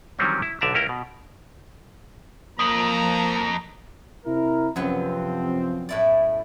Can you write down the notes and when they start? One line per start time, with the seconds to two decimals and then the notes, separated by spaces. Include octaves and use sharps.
0.19 D#3 E3 F#3 G3 C4 C#4
0.42 E4
0.61 B1 D3 D5 E5 A#5
0.74 C#2 C#4 E4 A#4 G5
0.89 B2
2.59 F2 F3 A#3 A#5 D#6 F#7
4.26 C3 E4 A#4
4.76 F#2 C3 F3 F#3 B3 C4
5.89 A2 E4 D5